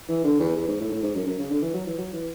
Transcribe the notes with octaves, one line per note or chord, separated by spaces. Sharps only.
E3
D3
E2
E2
G#2
A2
A2
G#2
F#2
F#2
C#3
D3
E3
F#3
E3
F#3
E3